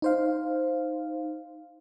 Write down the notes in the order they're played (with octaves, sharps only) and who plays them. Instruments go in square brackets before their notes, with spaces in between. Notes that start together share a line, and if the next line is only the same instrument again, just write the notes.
[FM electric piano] D#4 C5 F5